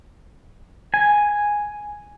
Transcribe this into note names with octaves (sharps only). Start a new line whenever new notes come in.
G#5